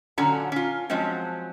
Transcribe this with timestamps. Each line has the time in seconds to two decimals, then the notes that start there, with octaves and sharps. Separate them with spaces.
0.18 A#2 D3 F#3 C#4 A5 A#5
0.52 C#4 F4
0.90 F3 F#3 G#3 C4 C#4